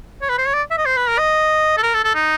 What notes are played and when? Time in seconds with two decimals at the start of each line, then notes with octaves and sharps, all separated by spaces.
0.22 C#5
0.30 B4
0.38 C5
0.46 C#5
0.54 D5
0.71 E5
0.78 D#5
0.86 C5
0.97 B4
1.07 A#4
1.19 D#5
1.78 A4
1.83 A#4
1.94 A4
2.04 A4
2.15 D#4